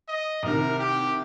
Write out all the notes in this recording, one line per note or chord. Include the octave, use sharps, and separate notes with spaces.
D#5
C2 C3 D#3 A#4
G4